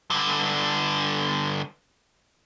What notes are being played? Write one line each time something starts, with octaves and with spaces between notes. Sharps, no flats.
G2 D3